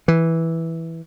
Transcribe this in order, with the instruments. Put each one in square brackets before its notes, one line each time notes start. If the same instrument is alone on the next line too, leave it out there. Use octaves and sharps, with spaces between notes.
[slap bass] E3